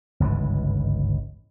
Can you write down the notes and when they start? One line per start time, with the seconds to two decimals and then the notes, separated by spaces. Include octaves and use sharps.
0.20 G1 C#2 G#2 E3